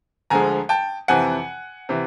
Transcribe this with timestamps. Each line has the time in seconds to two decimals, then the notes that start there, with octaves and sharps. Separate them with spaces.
0.30 D2 D3 F3 G#3 G#5 A#5
0.69 G5 A5
1.08 F2 C3 E3 F#5 G#5
1.89 C3 E3